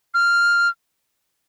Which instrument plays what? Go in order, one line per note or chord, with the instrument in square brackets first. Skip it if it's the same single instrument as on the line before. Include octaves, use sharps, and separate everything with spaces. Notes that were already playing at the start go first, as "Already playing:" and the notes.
[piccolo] F6